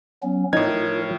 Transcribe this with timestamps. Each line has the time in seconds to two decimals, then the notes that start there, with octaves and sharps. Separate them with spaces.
0.23 F#3 B3 C#4
0.53 A2 F3 D#4 A#4 C#5 G#6